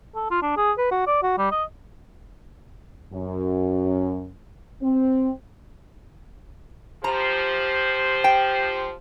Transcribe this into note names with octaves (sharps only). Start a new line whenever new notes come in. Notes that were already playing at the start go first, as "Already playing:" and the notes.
A4
F4
D4
G#4
B4
F#4
D5
F#4
G3
D#5
F#2
C4
F3 G4 C5 A#5
G5